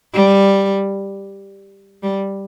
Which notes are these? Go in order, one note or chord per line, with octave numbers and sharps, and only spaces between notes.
G3
G3